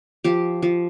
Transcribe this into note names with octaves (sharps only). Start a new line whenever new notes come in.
F3 G4
F3